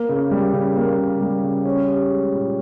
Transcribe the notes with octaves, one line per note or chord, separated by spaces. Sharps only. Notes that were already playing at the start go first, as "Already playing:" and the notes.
Already playing: A#3
C#3
G3
C#3
A#3
C#3
G3
C#3
C#4
G4
G#3
A#2